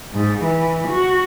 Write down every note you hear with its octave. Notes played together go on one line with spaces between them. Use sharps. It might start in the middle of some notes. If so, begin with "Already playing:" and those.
G#2
E3
F#4